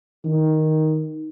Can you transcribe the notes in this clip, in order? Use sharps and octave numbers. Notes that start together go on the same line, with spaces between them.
D#3